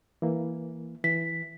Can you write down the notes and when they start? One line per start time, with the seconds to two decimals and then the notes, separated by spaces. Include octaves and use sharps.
0.22 E3 A#3
1.04 E3 B6